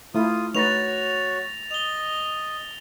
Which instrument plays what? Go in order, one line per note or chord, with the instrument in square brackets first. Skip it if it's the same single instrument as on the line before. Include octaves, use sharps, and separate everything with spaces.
[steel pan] A3 E4 [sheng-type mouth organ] F4 D#6
[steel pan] A3 D#4 B4 [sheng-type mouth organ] F#4 C#5 [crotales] A6 A#6 F7
[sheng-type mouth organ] D#5 [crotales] F7 G7